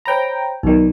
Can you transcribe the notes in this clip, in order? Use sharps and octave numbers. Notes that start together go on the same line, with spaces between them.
C5 C#5 G5 A#5 B5
B1 D#3 D#4 D5